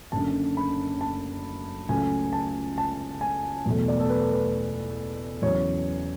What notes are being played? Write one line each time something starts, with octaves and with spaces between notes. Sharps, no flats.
F#1 F#2 D3 A5
B5
A5
C#2 C#3 F#3 A3 G#5
A5
A5
G#5
E2 B2 F#3 A3
D5
A4
B4
B4
E2 C#3 F#3 C#5